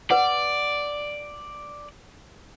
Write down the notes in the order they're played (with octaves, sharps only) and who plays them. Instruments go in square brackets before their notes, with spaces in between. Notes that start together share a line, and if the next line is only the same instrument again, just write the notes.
[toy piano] B4 F#5 [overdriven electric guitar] D5